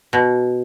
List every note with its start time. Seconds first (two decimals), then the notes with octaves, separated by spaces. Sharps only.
0.13 B2